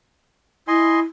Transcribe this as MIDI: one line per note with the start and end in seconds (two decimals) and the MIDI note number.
0.68 1.01 64
0.68 1.00 75
0.68 1.00 80
0.68 1.00 84